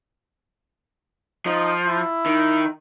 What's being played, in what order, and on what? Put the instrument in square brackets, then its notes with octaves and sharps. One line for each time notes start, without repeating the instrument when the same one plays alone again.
[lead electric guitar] F3 [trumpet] D#4
[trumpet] E4
[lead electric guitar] D#3